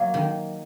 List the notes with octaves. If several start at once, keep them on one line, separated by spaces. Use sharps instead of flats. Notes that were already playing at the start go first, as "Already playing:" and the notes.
Already playing: F#3 A#3
D#3